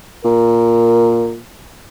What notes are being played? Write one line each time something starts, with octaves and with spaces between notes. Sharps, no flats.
A#2 A#4